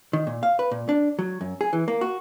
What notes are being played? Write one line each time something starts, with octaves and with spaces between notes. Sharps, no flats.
D#3
A#2
F5
B4
A#2
D4
F#3
F#2
G#4
E3
A#3
F#4